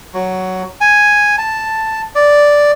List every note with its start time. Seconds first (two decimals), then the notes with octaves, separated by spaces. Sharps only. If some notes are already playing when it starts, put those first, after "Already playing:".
0.14 F#3
0.81 G#5
1.38 A5
2.15 D5